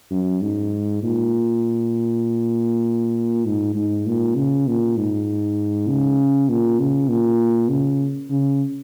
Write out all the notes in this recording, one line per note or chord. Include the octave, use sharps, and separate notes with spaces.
F#2
G#2
A#2
G#2
G#2
A#2
C#3
A#2
G#2
C#3
A#2
C#3
A#2
C#3
C#3